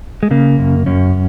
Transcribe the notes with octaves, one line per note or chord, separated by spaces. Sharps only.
G#3
C#3 A#3
F#2
F#2 C#4